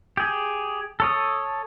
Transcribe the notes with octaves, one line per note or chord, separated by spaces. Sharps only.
G4 G#4
A4 C#5 D#6